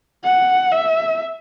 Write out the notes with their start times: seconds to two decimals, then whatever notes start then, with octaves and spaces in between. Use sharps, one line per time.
0.24 F#5
0.72 E5